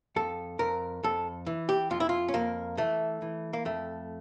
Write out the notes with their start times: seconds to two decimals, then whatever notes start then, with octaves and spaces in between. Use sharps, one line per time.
0.16 F2 A4
0.59 F2 A#4
1.03 F2 A4
1.46 E3
1.69 G4
1.91 F2 F4
2.00 E4
2.09 F4
2.28 C#4
2.34 F2 A#3
2.77 E3 A3
3.22 E3
3.53 A#3
3.65 F2 A3